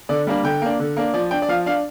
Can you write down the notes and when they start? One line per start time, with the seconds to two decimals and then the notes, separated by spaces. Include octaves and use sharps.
0.09 D3 D5
0.27 G3 A#3 D4
0.44 D3 G5
0.62 A#3 D4
0.79 D3
0.97 A#3 D4
1.14 F3 D5
1.31 D4 G5
1.42 D5
1.49 F3 F5
1.66 D4 F5